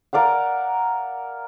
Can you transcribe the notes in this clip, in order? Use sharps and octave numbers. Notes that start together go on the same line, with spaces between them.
A#4 D5 F5 F#5